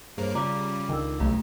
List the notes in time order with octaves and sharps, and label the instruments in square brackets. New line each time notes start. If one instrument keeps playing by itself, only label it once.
[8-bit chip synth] G2 A#3 A#4 [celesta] G#4 C5 C#5
[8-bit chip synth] C#3 G3 [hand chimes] F4 D5 D6 [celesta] A#5
[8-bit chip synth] C#2 [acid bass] D#3 [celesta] D4 A4 E6
[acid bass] B1 [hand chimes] A3 G4 A#5